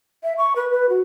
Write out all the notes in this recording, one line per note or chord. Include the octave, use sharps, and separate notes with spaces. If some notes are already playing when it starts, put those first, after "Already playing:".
E5
C#6
B4
B4
F#4